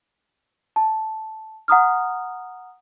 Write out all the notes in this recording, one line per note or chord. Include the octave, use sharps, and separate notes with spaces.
A5
F#5 A#5 D#6 F6